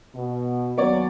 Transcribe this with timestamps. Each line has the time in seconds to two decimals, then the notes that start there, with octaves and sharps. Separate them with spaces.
0.15 B2
0.78 D#2 F#3 B3 C#5 D5